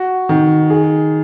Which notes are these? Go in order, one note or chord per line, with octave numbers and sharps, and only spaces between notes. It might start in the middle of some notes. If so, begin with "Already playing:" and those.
Already playing: F#4
D#3
G#4